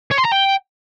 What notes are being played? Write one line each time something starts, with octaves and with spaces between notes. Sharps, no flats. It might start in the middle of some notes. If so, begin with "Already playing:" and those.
C#5
C6
A#5
G5